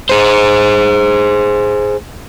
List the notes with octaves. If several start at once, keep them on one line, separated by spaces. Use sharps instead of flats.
G#4 C5